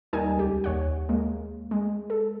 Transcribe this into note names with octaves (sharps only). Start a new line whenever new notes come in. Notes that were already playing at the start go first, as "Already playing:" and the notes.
D#2 G3 D#4 A#4 G#5
C#2 G4
D#2 C#5 F#5
G#3 A#3
G#3
A4